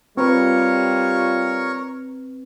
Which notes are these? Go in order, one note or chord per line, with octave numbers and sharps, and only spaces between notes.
G3 C4 F4 A#4 B4 C#5 C#6